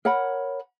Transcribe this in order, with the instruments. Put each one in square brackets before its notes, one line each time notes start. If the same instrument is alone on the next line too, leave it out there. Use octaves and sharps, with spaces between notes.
[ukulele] A#4 C#5 F#5 B5